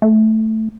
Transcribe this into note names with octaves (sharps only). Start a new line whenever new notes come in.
A3